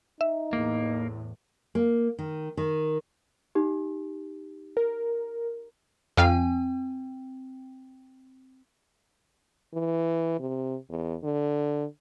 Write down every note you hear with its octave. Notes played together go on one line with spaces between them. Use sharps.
D#4 E5
E2 A2 A#3
A#3
D#3
D#3
D#4 G4
A#4
F2 C4 F5 G5
E3
C3
E2
D3